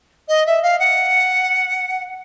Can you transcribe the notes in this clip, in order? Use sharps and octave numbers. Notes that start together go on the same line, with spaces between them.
D#5
E5
F5
F#5